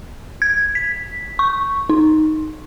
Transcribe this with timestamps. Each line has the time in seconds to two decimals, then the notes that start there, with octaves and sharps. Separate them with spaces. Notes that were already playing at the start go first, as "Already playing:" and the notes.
0.42 G#6
0.75 B6
1.39 C#6
1.90 D#4